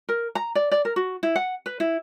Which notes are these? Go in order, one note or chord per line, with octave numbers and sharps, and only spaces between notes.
A#4
A#5
D5
D5
A#4
F#4
E4
F#5
B4
E4